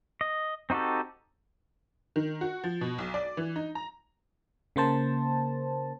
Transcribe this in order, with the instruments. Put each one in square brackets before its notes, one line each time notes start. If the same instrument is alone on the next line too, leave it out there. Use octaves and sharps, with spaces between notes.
[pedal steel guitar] D#5
C4 D#4 F#4 G4 A4
[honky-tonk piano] D#3
F#4
F3
B2
B1
D5
E3
D#4
A#5
[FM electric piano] C#3 A#3 C5 A5